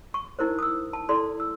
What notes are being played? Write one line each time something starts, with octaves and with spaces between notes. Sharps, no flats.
C#6
D#4 E4 A#4 C5
D#6 E6
A5
E4 A4 D5 C6
E6